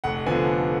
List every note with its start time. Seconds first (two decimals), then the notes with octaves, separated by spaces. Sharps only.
0.04 F1 F#5
0.26 D3 F3 B3 G#5